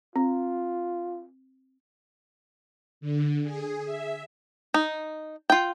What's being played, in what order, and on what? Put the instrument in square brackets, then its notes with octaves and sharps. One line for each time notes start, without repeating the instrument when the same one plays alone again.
[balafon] C4 [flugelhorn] F4
[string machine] D3
G#4
E5
[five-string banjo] D#4
F4 G5